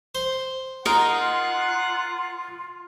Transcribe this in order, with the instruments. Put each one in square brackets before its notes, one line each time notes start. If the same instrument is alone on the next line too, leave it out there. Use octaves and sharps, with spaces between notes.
[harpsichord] C5
[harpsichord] D#4 [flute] F4 [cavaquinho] A#4 D#5 [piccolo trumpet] F#5